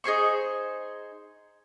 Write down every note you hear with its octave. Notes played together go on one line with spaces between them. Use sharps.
D#4 G#4 C5 C#6